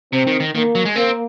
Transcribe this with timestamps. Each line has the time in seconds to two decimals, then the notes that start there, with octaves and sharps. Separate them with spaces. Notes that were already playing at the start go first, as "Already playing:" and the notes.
0.13 C3 C4
0.27 D#3
0.40 D#3
0.55 D#3 A#3
0.75 F#3
0.85 G#3
0.96 A#3 C4